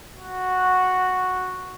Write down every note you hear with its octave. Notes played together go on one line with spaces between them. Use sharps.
F#4